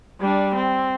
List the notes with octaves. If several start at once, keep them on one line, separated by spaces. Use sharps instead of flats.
G3 D4
C4